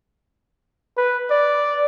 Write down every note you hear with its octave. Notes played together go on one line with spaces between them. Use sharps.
B4
D5